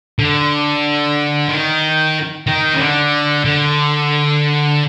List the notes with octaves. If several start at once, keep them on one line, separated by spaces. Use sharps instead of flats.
D3
D#3
D#3
C#3
D3
D3